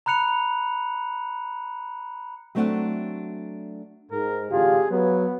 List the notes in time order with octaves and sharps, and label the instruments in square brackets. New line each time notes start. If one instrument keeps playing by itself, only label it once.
[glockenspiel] A#5 B5 F#6 C#7 F7
[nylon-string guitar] F#3 A3 C4 D4 E5 F#5
[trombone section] G#2 [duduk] A#4
[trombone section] A1 D3 F4 [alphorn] G4 [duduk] G#4
[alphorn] F#3 [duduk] B3 [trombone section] B4